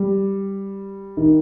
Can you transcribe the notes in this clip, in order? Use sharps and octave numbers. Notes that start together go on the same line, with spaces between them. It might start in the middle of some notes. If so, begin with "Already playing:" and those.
Already playing: G3
D#3